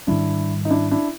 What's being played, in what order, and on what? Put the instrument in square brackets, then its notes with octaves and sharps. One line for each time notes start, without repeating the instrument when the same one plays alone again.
[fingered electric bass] G#2 D#3 G3 [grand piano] D4 E4
[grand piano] D#4
D4 E4
D4 E4